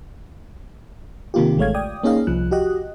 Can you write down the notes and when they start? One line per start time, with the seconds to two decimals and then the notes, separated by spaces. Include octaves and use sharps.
1.34 C3 D#3 A#3 F4 G4
1.58 A1 G#3 A3 C#5 F5 G#6
1.75 D5 G5 D#6
2.03 A#3 C#4 D#4 G#4 D#5 F5
2.27 C2 F3 F#6
2.51 F#4 G4 D#5 F#6